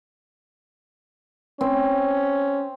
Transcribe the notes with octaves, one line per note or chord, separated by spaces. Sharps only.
C4 C#4